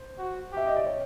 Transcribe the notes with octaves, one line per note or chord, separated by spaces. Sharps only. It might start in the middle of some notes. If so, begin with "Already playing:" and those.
Already playing: C5
F#4
G4 E5
D#5
D5
C#5